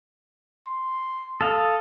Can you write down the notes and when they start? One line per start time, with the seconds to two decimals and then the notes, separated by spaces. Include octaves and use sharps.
0.67 C6
1.41 A4 F5 D#6